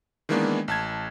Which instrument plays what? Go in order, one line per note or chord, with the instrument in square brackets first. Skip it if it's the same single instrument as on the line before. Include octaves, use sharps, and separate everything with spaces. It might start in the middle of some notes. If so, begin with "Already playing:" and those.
[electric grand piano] D#3 E3 G#3 A#3 B3 D4
A1 A5 G#6